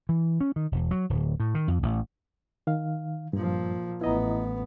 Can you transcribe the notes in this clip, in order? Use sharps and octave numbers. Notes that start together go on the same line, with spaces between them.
E3
C#4
D#3
E1
F#3
D1
A2
D#3
F2
A1
D#3 F5
G2 A#2 F3
A1 B3 E4 D#5 A#5